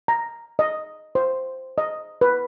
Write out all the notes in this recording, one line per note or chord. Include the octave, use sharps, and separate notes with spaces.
A#5
D#5
C5
D#5
B4